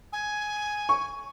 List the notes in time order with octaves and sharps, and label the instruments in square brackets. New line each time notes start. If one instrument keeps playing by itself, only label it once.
[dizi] G#5
[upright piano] C#6